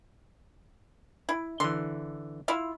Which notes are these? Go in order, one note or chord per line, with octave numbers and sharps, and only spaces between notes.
E4
D3 E3 C6
E4 F4